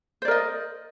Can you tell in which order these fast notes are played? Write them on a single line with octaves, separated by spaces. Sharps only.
C5 D5 A#4 D#5